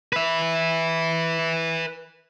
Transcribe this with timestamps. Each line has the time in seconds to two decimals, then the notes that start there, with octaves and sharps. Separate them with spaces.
0.13 B4 E5